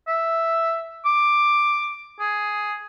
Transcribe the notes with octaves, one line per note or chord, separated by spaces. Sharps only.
E5
D6
G#4